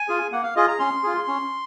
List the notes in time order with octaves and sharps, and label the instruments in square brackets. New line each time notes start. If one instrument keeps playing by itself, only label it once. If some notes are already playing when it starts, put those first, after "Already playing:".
Already playing: [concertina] G#5
F4 G#4
A#3 F#5
F5
F4 G#4 D#5
A#5
C#4 C6
F4 G#4
C#4